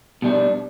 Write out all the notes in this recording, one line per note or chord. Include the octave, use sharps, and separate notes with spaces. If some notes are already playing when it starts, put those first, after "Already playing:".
B2 G3 D4